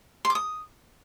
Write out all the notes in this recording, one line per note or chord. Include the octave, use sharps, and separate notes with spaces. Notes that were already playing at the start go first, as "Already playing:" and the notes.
C6
D6
D#6